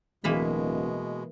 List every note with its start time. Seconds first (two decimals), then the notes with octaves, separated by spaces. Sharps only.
0.24 D1 B2 E3 G#3 A#3 B5